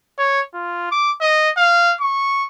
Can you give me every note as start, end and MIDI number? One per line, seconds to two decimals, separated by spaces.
0.18 0.41 73
0.54 0.90 65
0.91 1.12 86
1.21 1.50 75
1.57 1.94 77
2.01 2.47 85